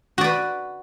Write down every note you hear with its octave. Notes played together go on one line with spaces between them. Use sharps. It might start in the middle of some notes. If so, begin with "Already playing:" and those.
F#4 B4 D5